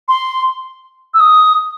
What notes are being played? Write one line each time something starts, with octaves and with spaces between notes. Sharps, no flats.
C6
E6
D#6